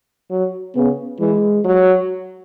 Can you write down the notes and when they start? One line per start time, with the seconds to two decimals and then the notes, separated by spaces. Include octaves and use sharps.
0.31 F#3
0.76 C#3 B3
1.20 E3 G#3
1.65 F#3